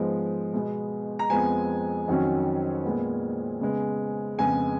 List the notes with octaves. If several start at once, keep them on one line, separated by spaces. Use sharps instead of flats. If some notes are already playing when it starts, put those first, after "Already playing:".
Already playing: G#2 F3 G#3 B3
B2 G#3 B3
A#5
F2 F3 G#3 B3 G#5
F2 D#3 F#3 C#4
A#2 G#3 B3
C#3 G#3 B3
F2 C#3 G#3 B3 G#5